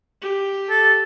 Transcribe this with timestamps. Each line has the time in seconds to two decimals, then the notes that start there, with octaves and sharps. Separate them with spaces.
0.21 G4
0.70 A4